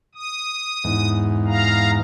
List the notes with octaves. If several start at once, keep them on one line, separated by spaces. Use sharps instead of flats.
D#6
E2 G#2
F5 A#5